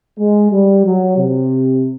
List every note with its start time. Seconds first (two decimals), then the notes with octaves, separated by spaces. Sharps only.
0.18 G#3
0.51 G3
0.85 F#3
1.17 C3